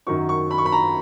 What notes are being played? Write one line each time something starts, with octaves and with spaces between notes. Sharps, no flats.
F#2 D#3 F#3 C#6
C#6
B5
C#6
B5
A#5